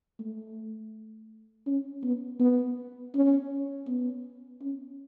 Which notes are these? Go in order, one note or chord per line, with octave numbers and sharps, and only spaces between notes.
A3
C#4
B3
B3
C#4
B3
C#4